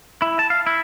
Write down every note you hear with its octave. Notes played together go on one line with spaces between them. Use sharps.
E4
A5
F5
E4